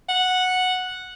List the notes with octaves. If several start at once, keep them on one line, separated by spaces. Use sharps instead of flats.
F#5